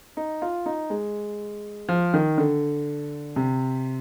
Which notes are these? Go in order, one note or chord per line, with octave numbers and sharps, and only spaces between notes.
D#4
F4
D#4
G#3
F3
D#3
D3
C3